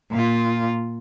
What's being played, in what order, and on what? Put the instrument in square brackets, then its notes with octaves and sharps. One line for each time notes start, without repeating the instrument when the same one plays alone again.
[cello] A#2 F4